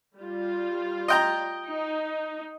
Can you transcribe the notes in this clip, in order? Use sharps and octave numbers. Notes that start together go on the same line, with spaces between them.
G3 F4
D#5 G5 A#5
D#4